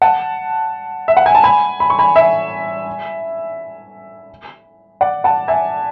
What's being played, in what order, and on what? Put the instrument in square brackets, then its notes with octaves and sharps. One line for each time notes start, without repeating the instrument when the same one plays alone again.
[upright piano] F#5 A5
E5
F#5
G#5
A5
G#5 B5
B5
C#6
G#5 B5
E5 G#5
D5 F#5
F#5 A5
E5 G#5